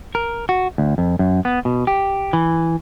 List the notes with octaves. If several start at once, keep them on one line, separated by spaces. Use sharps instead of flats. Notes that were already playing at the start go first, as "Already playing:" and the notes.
A#4
F#4
D2
F2
F#2
B3
B2
G4
E3